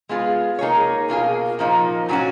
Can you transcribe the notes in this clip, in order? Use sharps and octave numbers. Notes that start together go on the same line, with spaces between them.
G#3 B3 F4 G#4
A#3 D#4 G#4 C#5
B2 A#3 F4 G#4
A#2 F3 A#3 D#4
A#2 F#3 C#4 F#4